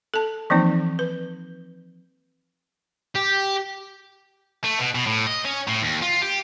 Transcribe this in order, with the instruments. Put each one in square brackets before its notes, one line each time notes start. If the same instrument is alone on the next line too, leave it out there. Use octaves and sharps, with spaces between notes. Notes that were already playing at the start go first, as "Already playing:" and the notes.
[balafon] A4 A5
E3 F3 A#3 C4 D#4
B4
[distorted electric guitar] G4
A3
B2
B2
A2
D#5
C#4
A2
D#2
F4
G4